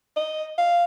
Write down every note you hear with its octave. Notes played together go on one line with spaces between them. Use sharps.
D#5
F5